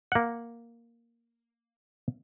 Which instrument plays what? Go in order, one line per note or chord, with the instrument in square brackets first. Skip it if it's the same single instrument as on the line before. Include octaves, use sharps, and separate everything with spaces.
[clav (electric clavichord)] A#3 F#5